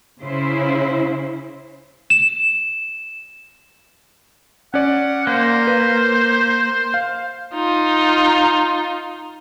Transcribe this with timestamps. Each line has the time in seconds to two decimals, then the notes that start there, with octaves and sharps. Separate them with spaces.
0.21 C#3 E4 C5
2.10 E7
4.74 C#4 D5 F#5
5.27 A#3 C5
5.67 B4
6.94 F5
7.54 D#4 F4